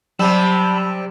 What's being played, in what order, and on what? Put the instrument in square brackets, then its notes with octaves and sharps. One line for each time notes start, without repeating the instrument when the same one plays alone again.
[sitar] C3 G3 [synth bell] F#3 E6 E7 [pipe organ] A5 B5